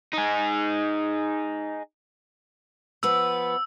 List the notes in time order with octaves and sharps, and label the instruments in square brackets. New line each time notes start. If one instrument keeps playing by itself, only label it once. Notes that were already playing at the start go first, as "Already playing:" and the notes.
[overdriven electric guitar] D#4 G#4
[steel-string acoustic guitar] F3 B3 B4 [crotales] E6